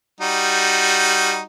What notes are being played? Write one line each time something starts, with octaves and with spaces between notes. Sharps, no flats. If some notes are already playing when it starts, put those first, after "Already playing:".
G3 D#4 F#4